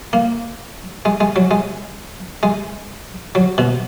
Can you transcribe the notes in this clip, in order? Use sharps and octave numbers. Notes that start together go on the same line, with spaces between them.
A#3
G#3
G#3
F#3
G#3
G#3
F#3
B2